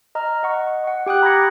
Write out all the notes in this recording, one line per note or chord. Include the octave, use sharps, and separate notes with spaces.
D#5 A#5 F6
D#5 F#5 C#6
F#5 C#6
G4 G5 D#6 F#6
A#5 B5 D6 G#6 A#6 C#7